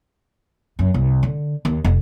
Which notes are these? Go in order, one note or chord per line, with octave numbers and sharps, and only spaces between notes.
F#2
C2
D3
D#2
F1